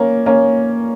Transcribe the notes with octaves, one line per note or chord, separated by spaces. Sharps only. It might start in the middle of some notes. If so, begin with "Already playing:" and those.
Already playing: A#3 C#4
A#3 C#4